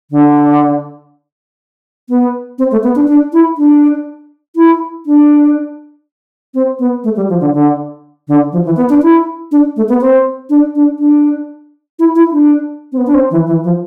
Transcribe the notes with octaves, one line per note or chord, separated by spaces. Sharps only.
D3
B3
C4
A3
B3
D4
D4
E4
D4
E4
D4
C4
B3
A3
G3
F3
D3
D3
D3
F3
E3
B3
D4
E4
D4
A3
B3
C4
D4
D4
D4
E4
E4
D4
C4
B3
D4
C4
E3
E3
F3